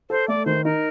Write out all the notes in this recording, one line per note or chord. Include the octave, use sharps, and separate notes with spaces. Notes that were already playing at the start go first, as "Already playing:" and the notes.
A4 C5
A3 D5
D#3 C5
D#4 A#4